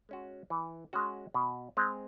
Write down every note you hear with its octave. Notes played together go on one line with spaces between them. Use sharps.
G#3 C#4 F#4
E3
G#3 C#4 F#4
B2
G#3 C4